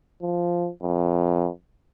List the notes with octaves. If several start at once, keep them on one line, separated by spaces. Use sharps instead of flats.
F3
F2